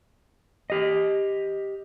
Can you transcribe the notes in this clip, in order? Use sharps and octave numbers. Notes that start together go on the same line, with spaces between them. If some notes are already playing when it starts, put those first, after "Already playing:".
G4 D#5